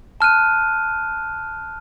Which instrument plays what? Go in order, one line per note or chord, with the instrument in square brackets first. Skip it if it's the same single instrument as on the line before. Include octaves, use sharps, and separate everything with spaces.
[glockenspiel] A5 F6 F#6 D#7